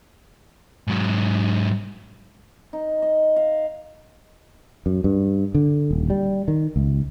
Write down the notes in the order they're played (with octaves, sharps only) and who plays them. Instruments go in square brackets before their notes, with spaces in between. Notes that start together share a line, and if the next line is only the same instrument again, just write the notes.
[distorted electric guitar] G#2 F#3
[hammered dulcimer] D#4
D#5
F5
[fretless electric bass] F#2
G2
D3
D#1
G3
D#3
C#2